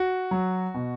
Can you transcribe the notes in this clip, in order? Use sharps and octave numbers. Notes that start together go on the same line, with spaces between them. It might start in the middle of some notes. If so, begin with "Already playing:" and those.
Already playing: F#4
F#3
B2